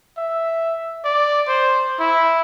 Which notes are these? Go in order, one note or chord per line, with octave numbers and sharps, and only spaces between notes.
E5
D5
C5
E4